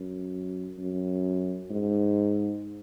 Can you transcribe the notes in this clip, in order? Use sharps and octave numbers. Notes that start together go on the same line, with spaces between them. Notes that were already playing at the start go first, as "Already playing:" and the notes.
Already playing: F#2
F#2
G#2